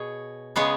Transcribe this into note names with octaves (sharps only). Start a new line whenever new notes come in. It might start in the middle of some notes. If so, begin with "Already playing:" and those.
Already playing: B2 G#4 C#5
C#3 G#3 B3 G#4 C#5